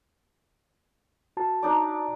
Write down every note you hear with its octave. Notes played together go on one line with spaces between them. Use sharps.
F#4 A5
D4 D#4 D5